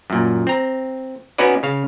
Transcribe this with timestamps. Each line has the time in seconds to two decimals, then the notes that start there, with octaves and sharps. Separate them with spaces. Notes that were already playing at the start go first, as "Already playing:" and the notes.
0.10 F#2 A#2
0.47 C4 A#5
1.38 B3 C#4 D#4 F#4 B4 D5
1.63 C#3 F5